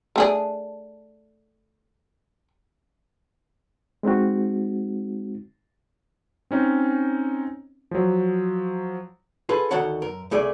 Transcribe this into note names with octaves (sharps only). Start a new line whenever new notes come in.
A3 D4 G#4
G#3 C4 D#4 F#4
C4 C#4 D#4
F3 F#3
F4 G#4 A4 B4
D2 D#3 F#4 A4 C#5 F#5
F#2 A#4
C2 A3 G#4 D5